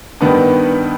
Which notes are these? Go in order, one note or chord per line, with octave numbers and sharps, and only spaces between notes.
G2 D#3 B3 D4